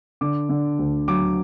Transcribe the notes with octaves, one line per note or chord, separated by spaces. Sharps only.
D3 D6
D3
D2
F#3 D6